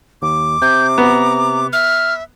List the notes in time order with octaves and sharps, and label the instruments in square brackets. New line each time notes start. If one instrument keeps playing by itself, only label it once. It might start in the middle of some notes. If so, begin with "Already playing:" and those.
[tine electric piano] D#2 [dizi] D6
[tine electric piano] C3 [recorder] G6
[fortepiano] B3 [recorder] A#5
[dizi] E5 [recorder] F6